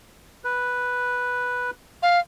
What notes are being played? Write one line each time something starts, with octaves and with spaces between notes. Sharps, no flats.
B4
F5